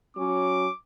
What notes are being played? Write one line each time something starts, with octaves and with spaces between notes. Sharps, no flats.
F#3 C#4 D6